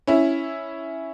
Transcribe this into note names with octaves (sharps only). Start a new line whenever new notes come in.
C#4 E4